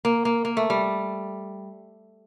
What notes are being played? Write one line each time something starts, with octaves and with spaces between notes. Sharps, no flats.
A#3
A#3
A#3
A3
G3